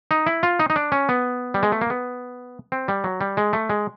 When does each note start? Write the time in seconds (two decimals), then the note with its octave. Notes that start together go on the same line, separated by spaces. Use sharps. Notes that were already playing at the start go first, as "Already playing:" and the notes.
0.11 D#4
0.26 E4
0.43 F4
0.59 D#4
0.70 D#4
0.76 D4
0.92 C#4
1.09 B3
1.54 G3
1.63 G#3
1.72 A3
1.81 A#3
1.90 B3
2.72 C4
2.88 G3
3.04 F#3
3.21 G3
3.37 G#3
3.53 A3
3.69 G#3